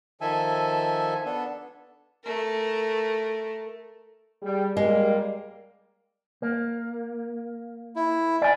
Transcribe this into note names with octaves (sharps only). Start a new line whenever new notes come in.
D#3 F3 A4 E5 G#5
B3 D4 A4
A3 A#4
G3 G#4
G3 G#3 A#3
A#3
E4
D5 G#5